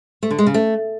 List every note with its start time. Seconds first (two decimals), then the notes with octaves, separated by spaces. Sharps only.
0.23 A3
0.31 D3
0.38 G#3
0.46 C#3
0.54 A3